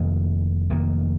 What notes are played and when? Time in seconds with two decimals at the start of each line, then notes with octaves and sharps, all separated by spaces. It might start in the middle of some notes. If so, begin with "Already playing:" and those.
Already playing: F1 F2 D#3 A#3
0.70 F1 F2 D#3 A#3